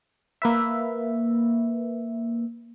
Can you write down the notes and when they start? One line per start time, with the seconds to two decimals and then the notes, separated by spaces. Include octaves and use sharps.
0.42 A#3 B4 E5